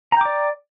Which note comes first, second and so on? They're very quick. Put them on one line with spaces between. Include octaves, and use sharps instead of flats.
A#5 G5 D6 D5